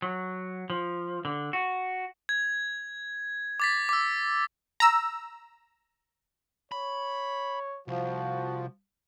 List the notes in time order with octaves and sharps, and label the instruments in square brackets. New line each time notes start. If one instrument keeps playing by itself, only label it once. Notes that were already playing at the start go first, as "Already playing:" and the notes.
[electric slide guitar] F#3
F3
D3
F#4
[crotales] G#6
D6 A6 B6
D6 E6
[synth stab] A#5 E6
[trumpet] C#5 [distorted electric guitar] B5
[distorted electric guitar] C2 [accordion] F3 [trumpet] F#4